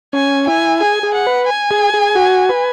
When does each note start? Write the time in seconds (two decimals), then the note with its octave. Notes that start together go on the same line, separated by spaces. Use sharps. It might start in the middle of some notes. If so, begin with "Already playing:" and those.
0.13 C#4 G#5
0.47 E4 G#5
0.80 G#4 G#5
1.03 G#4
1.15 F#5
1.27 B4
1.48 G#5
1.71 G#4
1.94 G#4
2.15 F#4
2.49 B4